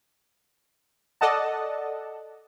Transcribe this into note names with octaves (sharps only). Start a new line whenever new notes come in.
A4 D5 D#5 F#5 A5